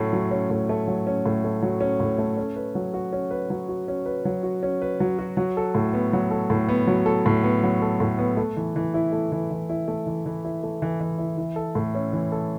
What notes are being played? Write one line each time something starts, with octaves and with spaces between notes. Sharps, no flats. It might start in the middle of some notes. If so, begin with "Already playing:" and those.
Already playing: A2 F#3 A3 C#4
F#3
C#4
A2
A3
F#3
C#4
A2
A3
F#3
C#4
A2
A3
C#4
B4
F#3
F#4
C#4
B4
F#3
F#4
C#4
B4
F#3
F#4
C#4
B4
F#3
F#4
F#3
A4
A2
B3
F#3
A4
A2
B3
F#3
A4
A2
B3
F#3
A4
A2
B3
A3
E3
E3
E4
A3
E3
E3
E4
A3
E3
E3
E4
A3
E3
E3
E4
E3
A4
A2
C#4
E3
A4